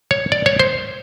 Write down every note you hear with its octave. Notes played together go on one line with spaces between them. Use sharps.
C#5
D5
C#5
C5